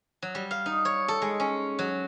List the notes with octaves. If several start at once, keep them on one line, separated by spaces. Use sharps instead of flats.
F#3
G3
F5
D#4
C#5
A4
G#3
C#4
F#3